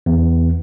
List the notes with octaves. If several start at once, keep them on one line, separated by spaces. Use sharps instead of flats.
E2